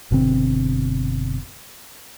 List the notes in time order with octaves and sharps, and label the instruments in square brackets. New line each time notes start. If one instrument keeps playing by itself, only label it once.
[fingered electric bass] F#1 B2 D3 C4